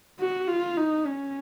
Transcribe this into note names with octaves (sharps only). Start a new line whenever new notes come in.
F#4
F4
D#4
C#4